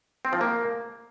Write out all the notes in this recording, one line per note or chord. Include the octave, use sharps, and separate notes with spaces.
C4
F3
A#3